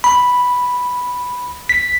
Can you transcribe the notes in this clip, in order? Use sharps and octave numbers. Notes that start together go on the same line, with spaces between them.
B5
B6